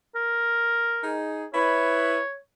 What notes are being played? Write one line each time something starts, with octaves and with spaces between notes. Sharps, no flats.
A#4
D#4 G#4
E4 B4 C#5